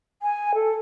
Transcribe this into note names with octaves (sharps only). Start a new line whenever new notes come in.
G#5
A4